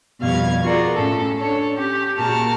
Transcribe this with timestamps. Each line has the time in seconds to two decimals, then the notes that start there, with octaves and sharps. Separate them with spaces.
0.21 F2 B2 G3 F5 G#6
0.63 F4 F#4 G#4 A#4 D5
0.95 A2 C#4 A4
1.38 D4 A4 C#5
1.74 C#4 G4
2.17 A#2 F#4 G#4 A#4 A5 F6